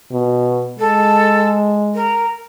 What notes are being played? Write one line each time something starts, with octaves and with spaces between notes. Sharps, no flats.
B2
G#3 A4
A#4